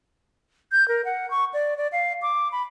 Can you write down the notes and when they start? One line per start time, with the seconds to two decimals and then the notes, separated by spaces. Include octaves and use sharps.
0.72 G6
0.88 A#4
1.05 F#5
1.31 C#6
1.54 D5
1.77 D5
1.92 F5
2.22 D6
2.52 B5